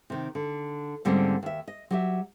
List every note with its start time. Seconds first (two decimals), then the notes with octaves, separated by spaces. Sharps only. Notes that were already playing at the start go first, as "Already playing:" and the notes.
0.10 C3 D#3
0.35 D3
1.05 G#2 D3 G3 A#3 C4 C#4
1.43 D#2 E5
1.68 D#5
1.91 F#3 G4 E5